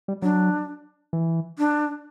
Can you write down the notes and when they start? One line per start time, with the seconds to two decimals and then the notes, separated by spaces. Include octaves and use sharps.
0.08 G3
0.22 F#3 D4
1.13 E3
1.58 D4